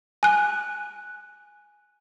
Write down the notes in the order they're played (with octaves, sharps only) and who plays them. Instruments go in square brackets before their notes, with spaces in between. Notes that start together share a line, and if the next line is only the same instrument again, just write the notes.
[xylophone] G#5 F#6